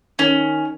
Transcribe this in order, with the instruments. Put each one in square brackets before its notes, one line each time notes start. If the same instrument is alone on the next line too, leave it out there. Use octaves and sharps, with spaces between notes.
[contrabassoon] D#3 [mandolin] C#4